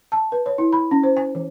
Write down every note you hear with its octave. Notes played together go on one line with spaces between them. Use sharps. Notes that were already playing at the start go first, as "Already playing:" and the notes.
A5
B4
C#5
E4
B5
C#4
C5
G#5
E3